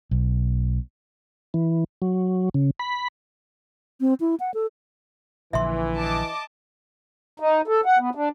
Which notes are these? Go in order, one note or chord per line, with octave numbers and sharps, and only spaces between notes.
B1
E3
F#3
C#3
B5
C4
E4
F#5
A4
A#1 A#2 D3 E3 E5 C6
D#5 A5 D6
D#4
A4
F#5
B3
D4